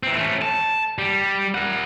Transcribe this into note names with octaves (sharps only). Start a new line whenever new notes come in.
E3 C4
A3 C#4
A5
G3
A#4 F#5